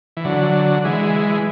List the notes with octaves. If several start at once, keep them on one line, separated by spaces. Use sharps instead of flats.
E3
D3 F#3
E3 G#3